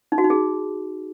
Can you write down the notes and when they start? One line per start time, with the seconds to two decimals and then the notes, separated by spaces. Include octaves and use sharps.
0.12 D#4
0.18 F#4
0.24 D#4
0.30 G#4